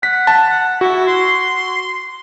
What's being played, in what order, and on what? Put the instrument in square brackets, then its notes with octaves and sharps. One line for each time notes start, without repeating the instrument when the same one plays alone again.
[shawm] F#5 [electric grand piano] B6
[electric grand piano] A5
[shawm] F#5
[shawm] E4 [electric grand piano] F#4
[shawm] C6